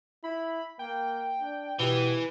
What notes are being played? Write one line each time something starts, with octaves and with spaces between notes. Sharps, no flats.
E4 B5
A#3 G5
D4
B2 E3 G4